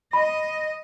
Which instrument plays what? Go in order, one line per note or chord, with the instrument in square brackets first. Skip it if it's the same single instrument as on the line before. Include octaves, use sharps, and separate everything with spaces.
[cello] D#5 [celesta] B5